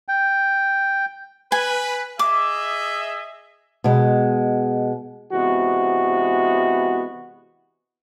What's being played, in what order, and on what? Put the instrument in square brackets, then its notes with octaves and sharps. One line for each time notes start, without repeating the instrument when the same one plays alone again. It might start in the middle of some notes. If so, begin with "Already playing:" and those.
[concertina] G5
[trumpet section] B4 [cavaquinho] G#5
[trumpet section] G#4 D#5 E5 [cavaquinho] D6
[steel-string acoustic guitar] B2 G#3
[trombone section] C3 E3 G#3 B3 F#4